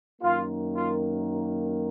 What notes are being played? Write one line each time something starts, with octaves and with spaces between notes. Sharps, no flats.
F#2 D#3 A#3 F4
F4